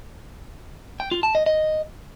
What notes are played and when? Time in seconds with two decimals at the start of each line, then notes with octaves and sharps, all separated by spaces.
1.00 G5
1.12 F4
1.23 A5
1.35 D#5
1.46 D#5